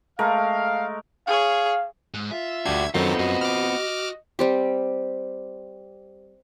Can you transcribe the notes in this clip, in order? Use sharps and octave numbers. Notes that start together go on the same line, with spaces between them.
G#3 A3 A#4 F5
G#4 C#5 F5
G#2
F4 E5
D2 D4 F#4 G4 G#6
F#2 D#3 F#3 B3 C4 D#4 F4 A4
F#2 F#4 D#5
D6 F6
G3 C4 G4